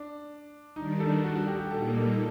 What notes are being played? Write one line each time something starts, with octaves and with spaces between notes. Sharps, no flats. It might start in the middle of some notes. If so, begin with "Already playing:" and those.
Already playing: D4
D#3 G3 D4 D#4
A4
F#4
F#4
G4
G4
A#2 G3 A#3 D#4 A4
A4